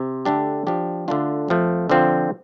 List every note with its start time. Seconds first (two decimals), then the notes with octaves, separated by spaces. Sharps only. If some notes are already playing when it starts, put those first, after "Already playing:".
Already playing: C3
0.25 D3 A3 D4 G4
0.67 F3 D4 G4
1.08 D3 A3 D4 F4
1.48 F2 F3 A3
1.89 D3 F3 C4 F4